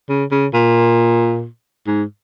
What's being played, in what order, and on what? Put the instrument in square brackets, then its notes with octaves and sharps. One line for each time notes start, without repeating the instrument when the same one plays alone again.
[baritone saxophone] C#3
C#3
A#2
G#2